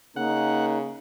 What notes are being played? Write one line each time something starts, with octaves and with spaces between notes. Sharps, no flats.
C#3 A#3 D#4 F#5